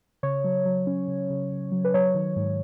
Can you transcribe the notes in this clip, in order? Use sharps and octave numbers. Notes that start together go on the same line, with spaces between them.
C#3 C#5
F#3
F#3
C#4
C#3
C#3
C#3
F#3
B4
F#3 C#5
D#3
G#2